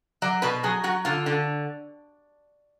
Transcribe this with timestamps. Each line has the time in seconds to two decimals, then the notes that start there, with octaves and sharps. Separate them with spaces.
0.22 F#3 D5
0.42 B2 B4
0.63 F#3 G#4
0.84 F#3 F#4
1.05 D3 F4
1.26 D3